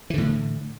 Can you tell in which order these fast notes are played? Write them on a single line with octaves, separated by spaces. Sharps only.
E3 D3 A2